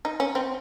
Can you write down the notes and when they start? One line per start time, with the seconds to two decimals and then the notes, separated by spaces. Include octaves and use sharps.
0.05 D#4
0.20 C#4
0.35 C4